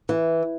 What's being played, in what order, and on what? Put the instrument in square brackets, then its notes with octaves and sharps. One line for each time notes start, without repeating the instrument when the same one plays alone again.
[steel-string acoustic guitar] E3